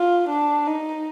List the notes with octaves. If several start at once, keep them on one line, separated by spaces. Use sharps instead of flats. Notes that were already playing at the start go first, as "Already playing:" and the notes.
Already playing: F4
D4
D#4